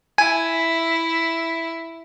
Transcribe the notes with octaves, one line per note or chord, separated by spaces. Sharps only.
E4 E5 G#5